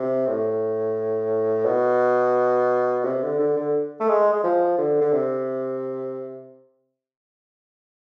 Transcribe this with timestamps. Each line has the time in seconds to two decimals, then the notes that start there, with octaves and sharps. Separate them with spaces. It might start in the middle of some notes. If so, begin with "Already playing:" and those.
Already playing: C3
0.27 A2
1.65 B2
3.04 C3
3.22 D3
3.39 D3
3.56 D3
4.00 A3
4.08 G#3
4.33 G#3
4.43 F3
4.78 D3
5.01 D3
5.12 C3